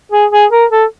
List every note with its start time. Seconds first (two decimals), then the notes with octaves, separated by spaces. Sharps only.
0.12 G#4
0.32 G#4
0.51 A#4
0.71 A4